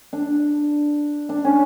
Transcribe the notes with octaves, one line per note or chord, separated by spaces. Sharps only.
D4
D4
C#4